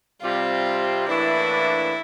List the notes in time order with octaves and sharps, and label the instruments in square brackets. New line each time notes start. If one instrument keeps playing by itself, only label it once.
[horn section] C3 G3 C4 [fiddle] F4
[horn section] A2 E3 A#3 D4 [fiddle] E4